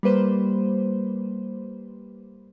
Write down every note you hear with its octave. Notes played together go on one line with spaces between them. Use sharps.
G3 A#3 B4 C5